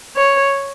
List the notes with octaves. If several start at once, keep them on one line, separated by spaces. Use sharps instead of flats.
C#5